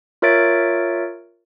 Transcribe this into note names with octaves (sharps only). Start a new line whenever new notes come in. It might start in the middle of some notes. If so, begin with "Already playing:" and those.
F4 A#4 C#5 E5 A6 D7